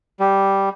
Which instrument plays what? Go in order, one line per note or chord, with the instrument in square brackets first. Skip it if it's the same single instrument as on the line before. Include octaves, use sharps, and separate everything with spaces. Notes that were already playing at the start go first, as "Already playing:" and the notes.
[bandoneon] G3